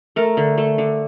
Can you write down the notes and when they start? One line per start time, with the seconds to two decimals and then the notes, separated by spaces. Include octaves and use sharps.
0.16 A3 A#4
0.37 D3
0.58 A3
0.78 D3